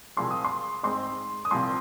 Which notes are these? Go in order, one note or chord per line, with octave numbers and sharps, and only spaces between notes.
C2 A#2 F3 G#3 C4 C6
D#6
C6
G#2 G#3 C4 D#4 C6
D#6
C2 A#2 F3 C4 C6